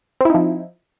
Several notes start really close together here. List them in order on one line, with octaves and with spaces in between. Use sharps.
C4 E4 D#4 F3